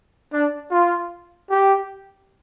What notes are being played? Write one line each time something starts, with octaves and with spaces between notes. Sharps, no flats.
D4
F4
G4